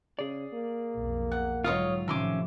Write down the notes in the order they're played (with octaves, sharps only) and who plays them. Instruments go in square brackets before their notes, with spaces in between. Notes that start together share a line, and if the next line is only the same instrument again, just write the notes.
[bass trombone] C#3 [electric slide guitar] G#4 D5
[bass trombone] A#3
[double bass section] B1 F2
[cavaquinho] F#5
[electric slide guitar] G#2 F4 [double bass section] D3 F#3 [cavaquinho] C#5 D#5 F5
[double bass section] A2 C3 F3 [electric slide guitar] D#3 C#4 [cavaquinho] E5 C6 D6